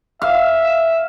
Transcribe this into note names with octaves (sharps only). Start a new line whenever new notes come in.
E5 F5